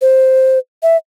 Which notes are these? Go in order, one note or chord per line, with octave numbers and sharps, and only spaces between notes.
C5
E5